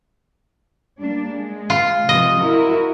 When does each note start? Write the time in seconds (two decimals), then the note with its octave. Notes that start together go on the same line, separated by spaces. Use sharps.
1.00 G3 A#3 D4
1.31 G#3
1.70 F4
2.09 C3 F3 D#5
2.39 E4 F#4 A#4